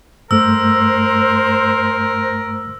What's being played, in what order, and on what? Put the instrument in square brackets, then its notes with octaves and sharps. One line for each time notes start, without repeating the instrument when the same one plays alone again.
[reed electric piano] G2 A3 [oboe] A#4 [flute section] C5 [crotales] E6